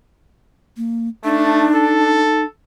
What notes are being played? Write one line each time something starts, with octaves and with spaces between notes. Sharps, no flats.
A#3
A3 D4 D#4
A4